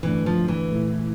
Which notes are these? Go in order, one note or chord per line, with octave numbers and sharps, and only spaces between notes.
G2 D3 E3 A3 D4
F3
E3
A#2 A3 E4